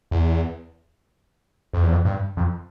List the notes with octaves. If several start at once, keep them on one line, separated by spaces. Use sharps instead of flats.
E2
F2
E2
F2
G2
F2